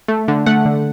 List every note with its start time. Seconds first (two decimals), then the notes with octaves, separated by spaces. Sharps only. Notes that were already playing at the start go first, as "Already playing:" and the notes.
0.08 A3
0.28 D3
0.46 A3 F#5
0.65 D3